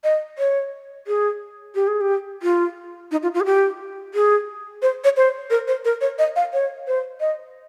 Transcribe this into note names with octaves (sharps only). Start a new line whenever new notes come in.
D#5
C#5
G#4
G4
G#4
G4
F4
D#4
F4
F4
G#4
G4
G#4
C5
C#5
C5
A#4
C5
A#4
C#5
D#5
F5
C#5
C5
D#5